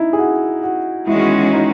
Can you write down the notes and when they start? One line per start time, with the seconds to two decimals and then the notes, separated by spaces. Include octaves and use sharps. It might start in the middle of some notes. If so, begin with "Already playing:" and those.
Already playing: D#4 E4
0.13 G#4
0.19 F#4
0.63 F#4
1.07 E2 D#3 G#3 C#4 E4 F#4
1.53 D#4